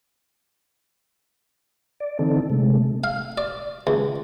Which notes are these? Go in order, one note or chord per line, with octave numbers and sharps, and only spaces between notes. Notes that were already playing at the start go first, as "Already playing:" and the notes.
D5
D3 E3 C4 D#4 A4
C3 G#3 A3
F5
D5
C#2